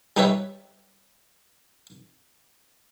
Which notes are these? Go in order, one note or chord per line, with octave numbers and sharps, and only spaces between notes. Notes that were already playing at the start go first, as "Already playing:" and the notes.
G3 D#4 G4 B4 C#5 E5